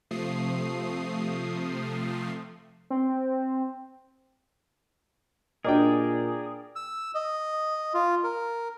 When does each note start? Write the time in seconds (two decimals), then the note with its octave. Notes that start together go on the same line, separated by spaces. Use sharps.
0.11 C3 F3 A3 D#6 C7
2.90 C4
5.65 A#2 D4 F#4 G#4 A#4 D5 D#5 G5
6.76 E6
7.15 D#5
7.94 F4
8.24 A#4